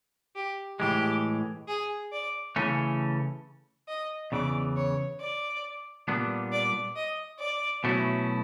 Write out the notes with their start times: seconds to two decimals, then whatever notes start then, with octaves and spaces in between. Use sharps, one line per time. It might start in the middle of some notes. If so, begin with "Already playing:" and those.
0.35 G4
0.80 A2 E3 G#3 G4
1.68 G#4
2.12 D5
2.56 C#3 E3 A3 C#4
3.88 D#5
4.32 E2 C#3 E3 D5
4.76 C#5
5.20 D5
6.08 A#2 G3 B3 D4
6.52 D5
6.95 D#5
7.39 D5
7.84 B2 F#3 A3 C#4 E4